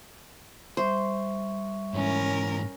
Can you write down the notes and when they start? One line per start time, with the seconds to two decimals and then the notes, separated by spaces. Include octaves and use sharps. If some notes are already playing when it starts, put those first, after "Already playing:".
0.77 G3 C5 E5 C#6
1.94 G#2 E3 C#4 A#4